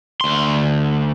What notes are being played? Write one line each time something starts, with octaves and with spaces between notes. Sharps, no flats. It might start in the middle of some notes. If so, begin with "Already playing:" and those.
D2 C6